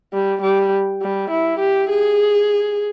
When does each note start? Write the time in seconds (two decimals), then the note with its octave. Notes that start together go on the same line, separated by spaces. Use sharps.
0.13 G3
0.42 G3
1.02 G3
1.30 E4
1.59 G4
1.90 G#4